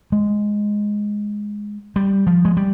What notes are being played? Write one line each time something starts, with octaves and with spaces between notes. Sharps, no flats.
G#3
G3
F3
G#3
G3